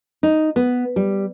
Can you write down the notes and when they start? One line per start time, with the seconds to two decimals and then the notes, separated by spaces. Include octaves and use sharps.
0.23 D#4
0.56 B3
0.96 G3